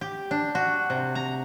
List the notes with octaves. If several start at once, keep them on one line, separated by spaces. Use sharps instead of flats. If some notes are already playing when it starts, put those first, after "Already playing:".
G4
D4
F#4
C3
A#5